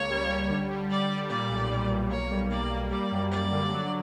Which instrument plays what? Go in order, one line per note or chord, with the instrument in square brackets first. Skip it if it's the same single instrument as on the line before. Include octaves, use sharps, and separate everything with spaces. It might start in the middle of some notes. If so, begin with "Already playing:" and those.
Already playing: [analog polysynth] C#2 A#3 [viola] C#5
[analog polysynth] G3
G3
D3
G3
[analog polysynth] G3 [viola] D5
[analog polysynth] G3
[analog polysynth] A#2 [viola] D5
[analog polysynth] B1
A#2
B1
[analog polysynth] A#3 [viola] C#5
[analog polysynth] G3
[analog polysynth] A#3 [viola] D5
[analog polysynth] A#3
[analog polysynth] G3 [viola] D5
[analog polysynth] F#2
[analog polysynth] G3 [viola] D5
[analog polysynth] D3
F#3